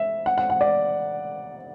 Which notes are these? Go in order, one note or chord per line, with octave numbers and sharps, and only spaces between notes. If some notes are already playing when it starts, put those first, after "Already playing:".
Already playing: E5
F#5
F#5
F#5
D5